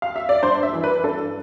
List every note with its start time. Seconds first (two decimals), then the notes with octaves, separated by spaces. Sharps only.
0.02 F5
0.16 E5
0.29 D5
0.43 G2 C5
0.63 E5
0.73 E3
0.84 B4
1.04 G2 A4